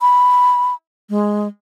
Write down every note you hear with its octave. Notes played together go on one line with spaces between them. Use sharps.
B5
G#3